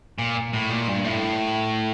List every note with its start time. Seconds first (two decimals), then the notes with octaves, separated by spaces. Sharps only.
0.19 A#2
0.53 A2
0.70 A#2
0.88 G2
1.04 A2